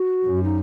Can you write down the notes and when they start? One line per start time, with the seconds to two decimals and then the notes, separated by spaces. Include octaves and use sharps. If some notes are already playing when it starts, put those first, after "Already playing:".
Already playing: F#4
0.24 F#2
0.44 D#4